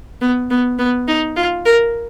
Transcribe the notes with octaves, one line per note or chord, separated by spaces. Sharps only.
B3
B3
B3
D#4
F4
A#4